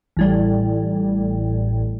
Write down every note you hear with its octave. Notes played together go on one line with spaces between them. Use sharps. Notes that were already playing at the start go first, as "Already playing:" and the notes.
A1 A2 G3